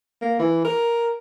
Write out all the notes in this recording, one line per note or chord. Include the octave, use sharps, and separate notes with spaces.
A#3
E3
A#4